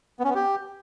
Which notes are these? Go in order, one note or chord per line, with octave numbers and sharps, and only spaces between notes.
B3
C#4
B3
G4